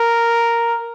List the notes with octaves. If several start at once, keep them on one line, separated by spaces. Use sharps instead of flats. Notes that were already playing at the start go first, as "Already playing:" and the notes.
Already playing: A#4